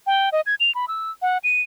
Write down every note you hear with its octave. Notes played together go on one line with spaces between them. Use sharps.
G5
D#5
G#6
F7
B5
E6
F#5
D#7